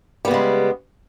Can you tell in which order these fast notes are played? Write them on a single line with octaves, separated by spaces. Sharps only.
G3 B3 C#3 G#3